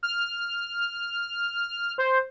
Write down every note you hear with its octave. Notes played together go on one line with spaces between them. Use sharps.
F6
C5